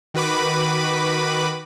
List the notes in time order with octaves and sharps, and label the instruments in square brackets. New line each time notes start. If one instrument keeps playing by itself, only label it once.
[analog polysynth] D#3 F#4 B4 B5 D6